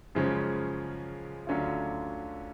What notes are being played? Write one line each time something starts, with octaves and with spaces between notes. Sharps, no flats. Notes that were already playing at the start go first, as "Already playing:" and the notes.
F#2 C#3 F3 G#3 C#4
D2 D3 F#3 C#4 F4